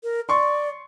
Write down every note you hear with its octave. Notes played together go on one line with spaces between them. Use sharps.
A#4
D5 C6 C#6